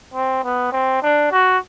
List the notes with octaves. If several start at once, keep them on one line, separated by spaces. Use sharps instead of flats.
C4
B3
C4
D4
F#4